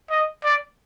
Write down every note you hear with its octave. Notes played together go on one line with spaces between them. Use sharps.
D#5
D5